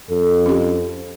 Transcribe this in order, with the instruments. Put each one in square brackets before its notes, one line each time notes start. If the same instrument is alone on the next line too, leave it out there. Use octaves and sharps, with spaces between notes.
[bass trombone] F2 [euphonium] A4
[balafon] C#4 G4